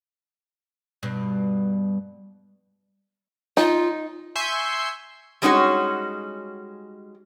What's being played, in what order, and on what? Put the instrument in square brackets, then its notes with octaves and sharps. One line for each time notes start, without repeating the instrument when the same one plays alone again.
[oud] G2 B2
[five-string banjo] D#4 [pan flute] F4
[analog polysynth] E5 G#5 C6 C#6 G6 C7
[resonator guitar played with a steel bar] G3 G#3 C#4 D#4 F#4 C#5